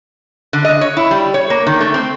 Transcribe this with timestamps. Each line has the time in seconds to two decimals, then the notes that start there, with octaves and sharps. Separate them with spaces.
0.53 D3
0.65 D#5
0.81 C#5
0.97 E4
1.11 G3
1.34 C#5
1.50 A#3
1.67 D#3
1.81 A3
1.94 C4